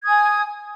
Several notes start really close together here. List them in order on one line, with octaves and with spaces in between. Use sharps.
G#6 D#6 G#5